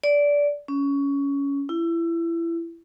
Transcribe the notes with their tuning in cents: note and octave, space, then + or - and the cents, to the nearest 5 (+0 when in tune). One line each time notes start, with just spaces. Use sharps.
D5 -15
C#4 +15
E4 +25